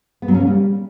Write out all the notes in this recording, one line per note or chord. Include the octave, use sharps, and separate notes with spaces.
B3
F#3
C#4
A#3
G3